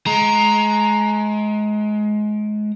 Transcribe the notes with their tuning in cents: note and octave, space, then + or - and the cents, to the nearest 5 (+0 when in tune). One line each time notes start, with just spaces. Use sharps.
G#3 +25 A#5 +0